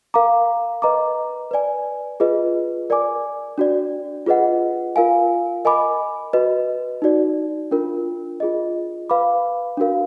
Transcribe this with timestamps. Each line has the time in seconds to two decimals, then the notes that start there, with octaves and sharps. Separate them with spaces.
0.14 A#4 F5 A#5 D6
0.82 B4 D#5 A#5 D6
1.51 B4 D5 G#5
2.20 F4 G#4 B4 D#5
2.90 A#4 D5 G#5 D6
3.58 D4 F#4 D5
4.26 F4 G#4 B4 D#5 F#5
4.96 F4 A#4 F5 G#5
5.65 A#4 D#5 G#5 B5 D6
6.33 F#4 B4 D#5
7.02 D#4 F#4 D5
7.71 D4 F4 A#4
8.40 F4 G#4 D#5
9.10 B4 F5 B5 D6
9.77 D4 F#4 A#4 F5